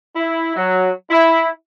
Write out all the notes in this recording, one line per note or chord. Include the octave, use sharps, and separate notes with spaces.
E4
F#3
E4